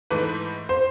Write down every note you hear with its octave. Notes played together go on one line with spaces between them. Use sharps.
G#2 E3 A3 B4 B5
C5 C6